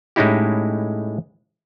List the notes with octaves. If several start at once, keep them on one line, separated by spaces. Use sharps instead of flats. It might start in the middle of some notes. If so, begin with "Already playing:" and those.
A2 G#3 C#4 D#4 E4 G4